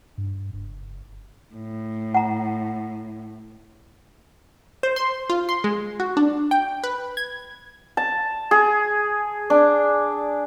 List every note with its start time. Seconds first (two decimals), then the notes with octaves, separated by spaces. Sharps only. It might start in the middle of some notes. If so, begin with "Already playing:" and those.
0.18 G2
0.53 F#1
1.54 A2
2.14 F#5 A#5
4.83 C5
4.96 C6
5.30 F4
5.49 C6
5.64 G#3
6.00 F#4
6.17 D4
6.51 G5
6.84 B4
7.17 G#6
7.97 A5
8.51 G#4
9.50 D4